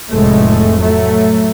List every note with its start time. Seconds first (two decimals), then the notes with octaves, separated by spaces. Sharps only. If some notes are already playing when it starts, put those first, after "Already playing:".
0.11 F1 A2 G#3 A3
0.80 A2 F#3 A3